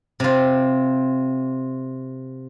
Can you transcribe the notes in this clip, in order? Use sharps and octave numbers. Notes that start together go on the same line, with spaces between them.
C3 F4